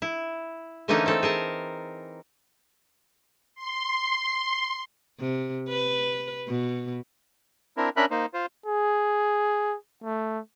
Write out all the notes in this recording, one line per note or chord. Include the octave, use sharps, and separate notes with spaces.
E4
D3 E3 A3 A#3 C#4 D#4
C4 A4
G#4 A#4 A5
C6
C3
B4
B2
C4 D4 E4 A#4
C#4 D4 A#4 E5 B5 F#6
A#3 D#4 C5
F4 C5
G#4
A3